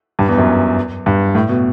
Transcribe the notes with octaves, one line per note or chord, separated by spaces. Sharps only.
G2
E2
F#2
G2
A2
B2